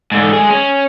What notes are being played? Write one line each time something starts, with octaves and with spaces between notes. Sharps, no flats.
G#2 D3
G#3 G#4
C#4